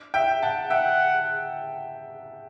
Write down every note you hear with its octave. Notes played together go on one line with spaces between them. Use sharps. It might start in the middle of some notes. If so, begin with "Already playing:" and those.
E5 G5
F#5 A5
E5 F#5 G5